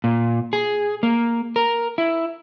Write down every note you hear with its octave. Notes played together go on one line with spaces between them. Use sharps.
A#2
G#4
A#3
A#4
E4